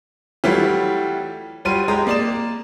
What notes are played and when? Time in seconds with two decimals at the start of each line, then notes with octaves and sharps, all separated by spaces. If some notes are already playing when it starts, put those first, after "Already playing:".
0.44 E3 F#3 G3 A3 F4 G4
1.65 F#3 G3 F4 C6 D#7
1.88 G#3 G4 A#5 D#6
2.07 A#3 D5 E7